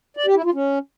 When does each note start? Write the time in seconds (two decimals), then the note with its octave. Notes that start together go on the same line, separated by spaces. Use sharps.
0.17 D5
0.26 G4
0.35 E4
0.45 F4
0.54 C#4